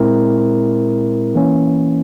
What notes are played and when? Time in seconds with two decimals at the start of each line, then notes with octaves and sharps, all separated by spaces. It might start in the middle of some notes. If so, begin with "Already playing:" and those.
Already playing: A#2 G#3 C4 E4 A#4
1.35 E3 A#3 C#4